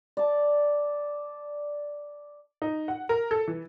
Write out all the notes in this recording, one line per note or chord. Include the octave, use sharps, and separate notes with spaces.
D5 A5
D#4
F#5
A#4
A4
E3